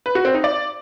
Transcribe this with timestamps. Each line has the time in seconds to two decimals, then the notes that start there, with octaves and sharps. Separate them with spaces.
0.06 B4
0.15 F#4
0.25 C4
0.34 D#4
0.44 D5